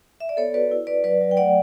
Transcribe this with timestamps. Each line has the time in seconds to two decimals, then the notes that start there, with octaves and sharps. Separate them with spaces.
0.20 E5
0.29 D5
0.37 B3 A4 C#5
0.54 F#4 B4 D5
0.71 E4
0.87 E4 B4 D5
1.04 F#3 B4 D5
1.21 F#3
1.31 G5
1.37 A3 D5 F#5